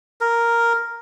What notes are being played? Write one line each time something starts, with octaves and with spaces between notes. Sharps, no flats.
A#4